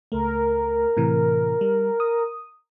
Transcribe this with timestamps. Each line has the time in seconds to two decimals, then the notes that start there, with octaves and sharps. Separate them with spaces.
0.12 C#2 A3 A#4
0.97 A2 C3 E3
1.61 G3
2.00 D#6